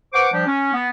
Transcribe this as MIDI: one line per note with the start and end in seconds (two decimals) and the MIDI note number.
0.13 0.28 71
0.13 0.28 72
0.13 0.28 78
0.13 0.28 85
0.13 0.28 86
0.33 0.43 53
0.33 0.43 55
0.33 0.43 62
0.33 0.43 67
0.47 0.72 61
0.74 0.89 59